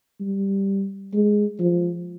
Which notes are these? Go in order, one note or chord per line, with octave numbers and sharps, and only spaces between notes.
G3
G#3
F3